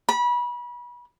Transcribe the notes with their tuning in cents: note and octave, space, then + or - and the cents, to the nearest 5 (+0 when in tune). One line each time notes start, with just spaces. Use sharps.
B5 -30